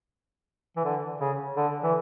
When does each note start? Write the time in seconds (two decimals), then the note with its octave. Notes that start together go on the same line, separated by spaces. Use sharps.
0.77 E3
0.85 D3
1.21 C#3
1.57 D3
1.83 E3